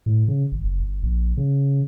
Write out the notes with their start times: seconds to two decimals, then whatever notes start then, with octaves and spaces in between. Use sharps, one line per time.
0.06 A2
0.28 C#3
0.52 G#1
0.64 F#1
0.80 G1
1.03 A#1
1.37 C#3